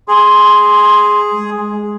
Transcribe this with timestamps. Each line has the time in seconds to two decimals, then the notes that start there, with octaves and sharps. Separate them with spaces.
0.08 G#4 C6
1.31 G#3